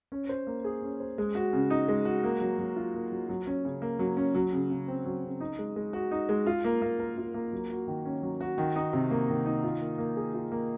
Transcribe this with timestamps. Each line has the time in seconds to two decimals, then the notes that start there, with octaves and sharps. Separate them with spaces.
0.12 C#4
0.29 C5
0.47 A#3
0.64 G#4
0.82 C#4
1.00 C5
1.18 G#3
1.35 F#4
1.53 C#3
1.70 D#4
1.88 G#3
2.05 F#4
2.24 A#3
2.41 F#3
2.59 F#3
2.76 F4
2.94 A#3
3.12 F#3
3.29 F#3
3.47 C#4
3.65 C#3
3.82 A#3
3.99 F#3
4.17 C#4
4.35 F#3
4.53 C#3
4.70 C#3
4.88 C4
5.06 F#3
5.23 C#3
5.40 D#4
5.58 G#3
5.76 G#3
5.93 F#4
6.11 D#4
6.29 G#3
6.46 F4
6.65 A#3
6.82 A#3
6.99 A#4
7.17 F4
7.34 A#3
7.52 F#3
7.70 F#4
7.87 D#3
8.05 C#4
8.22 F#3
8.41 F#4
8.58 D#3
8.76 D#4
8.93 C3
9.11 A#3
9.29 D#3
9.46 D#4
9.64 F4
9.81 A#3
9.98 A#3
10.16 G#4
10.34 F4
10.52 A#3